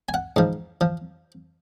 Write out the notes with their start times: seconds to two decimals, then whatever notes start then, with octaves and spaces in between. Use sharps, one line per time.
0.09 G#5
0.14 F#5
0.36 G#2 F3
0.81 F3